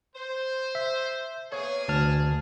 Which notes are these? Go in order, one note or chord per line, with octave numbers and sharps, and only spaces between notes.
C5
E5
A#3 B3 G#4 C#5
D2 A5 F6